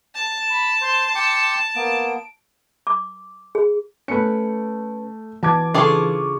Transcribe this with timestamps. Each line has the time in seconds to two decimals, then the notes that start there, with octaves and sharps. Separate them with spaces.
0.15 A5
0.50 B5
0.81 C5 C6
1.15 G5 C6 D6 C#7
1.76 A#3 B3 D7
2.87 D6
3.55 G#4
4.08 A3 C#4 B4 C#7
5.43 E3 F#4 A5 D6 G#6
5.74 C#3 D4 F4 G#4 A4 C#6 D6